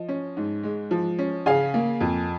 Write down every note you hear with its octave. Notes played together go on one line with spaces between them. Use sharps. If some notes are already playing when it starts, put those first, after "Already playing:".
Already playing: F3 D#5
C#4
G#2
G#3
F3
C#4
C#3 F5 G#5
A#3
F2